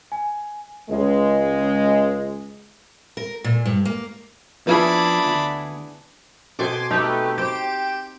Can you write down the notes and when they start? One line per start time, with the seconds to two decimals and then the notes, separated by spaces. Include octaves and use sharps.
0.12 G#5
0.90 C#2 G#3
3.17 A#4
3.44 A#2
3.65 G2
3.85 A#3
4.67 F3 B3 D4 E4 G#4 B5
5.26 D2
6.59 B2 C4 A4 G#5 C6 D6
6.91 A3 D#4 G4 B4
7.38 G4 C5 D7 E7